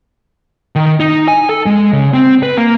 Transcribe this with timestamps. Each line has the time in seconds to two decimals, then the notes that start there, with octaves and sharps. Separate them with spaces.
0.76 D#3
1.00 D#4
1.28 G#5
1.49 A4
1.66 G#3
1.93 C#3
2.14 C4
2.43 B4
2.58 A#3